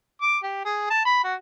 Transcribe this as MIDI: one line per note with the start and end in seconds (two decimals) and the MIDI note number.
0.22 0.38 86
0.44 0.64 67
0.65 0.90 68
0.90 1.03 81
1.05 1.22 83
1.24 1.35 66